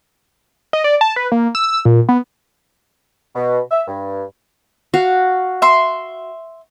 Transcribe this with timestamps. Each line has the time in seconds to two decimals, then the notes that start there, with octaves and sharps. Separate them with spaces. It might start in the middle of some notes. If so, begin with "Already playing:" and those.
0.73 D#5
0.84 D5
1.01 A5
1.16 B4
1.32 A#3
1.55 E6
1.85 A#2
2.09 B3
3.35 B2
3.71 E5
3.88 G2
4.94 F#4 F5
5.62 E5 C6